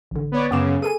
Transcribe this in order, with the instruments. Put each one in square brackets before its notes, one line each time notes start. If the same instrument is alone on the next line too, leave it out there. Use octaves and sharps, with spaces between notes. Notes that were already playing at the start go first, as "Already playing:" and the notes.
[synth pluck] A1 D3
[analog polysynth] B3 C#5 D5
[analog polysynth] F#2 C#3 [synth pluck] B3 D6 E7
[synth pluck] G#4 A4 G#5 [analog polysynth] D#7